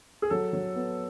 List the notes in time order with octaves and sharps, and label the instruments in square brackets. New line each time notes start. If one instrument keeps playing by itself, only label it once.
[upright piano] G#4
[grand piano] F#3 [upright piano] A4
[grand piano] F#3
B3